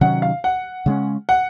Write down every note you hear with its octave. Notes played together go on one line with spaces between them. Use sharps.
C3 D#3 F#3 C#4 F#5
F5
F#5
C#3 G#3 C#4
F#5